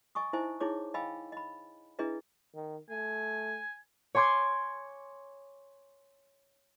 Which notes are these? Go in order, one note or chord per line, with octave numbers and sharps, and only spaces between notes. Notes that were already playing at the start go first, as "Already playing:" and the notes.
D#5 G#5 C#6 D#6
D#4 E4 C5 D#5 E5 G#5
D#4 E4 G#4 C#5 D6
D#5 F5 G5 G#5 B5 E6
D#5 B5
D4 E4 G#4 B4 D#5 E5
D#3
A3 G#5
C#5 G#5 C6 D6 G#6 C7